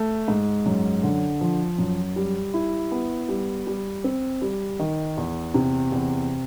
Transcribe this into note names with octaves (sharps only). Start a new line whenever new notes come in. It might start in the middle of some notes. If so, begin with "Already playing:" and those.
Already playing: A3
G#2
F#2
D3
F3
F#2
G3
E4
B3
G3
G3
C4
G3
D#3
E2
C3
E2